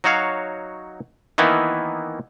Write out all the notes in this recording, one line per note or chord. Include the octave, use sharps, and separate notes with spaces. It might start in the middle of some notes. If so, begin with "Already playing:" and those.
F#3 D#4 F#4 C#5 F5
D#3 E3 A#3 B3 D#4 E4